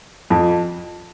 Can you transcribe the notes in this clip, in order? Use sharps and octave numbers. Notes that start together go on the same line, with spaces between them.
F2